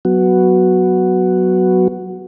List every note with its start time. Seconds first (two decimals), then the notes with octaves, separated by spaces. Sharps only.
0.05 F#3 B3 F#4